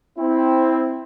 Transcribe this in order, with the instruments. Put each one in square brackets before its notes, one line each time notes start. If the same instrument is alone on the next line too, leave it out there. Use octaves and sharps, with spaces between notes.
[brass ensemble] C4 E4